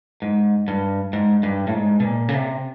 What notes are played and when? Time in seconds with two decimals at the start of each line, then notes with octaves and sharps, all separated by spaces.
0.22 G#2
0.68 G2
1.13 G#2
1.43 G2
1.67 A2
1.74 G#2
2.00 B2
2.05 A#2
2.28 C#3
2.34 C3